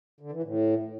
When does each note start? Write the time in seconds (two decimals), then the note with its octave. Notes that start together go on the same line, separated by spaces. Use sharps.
0.20 D3
0.32 E3
0.43 A2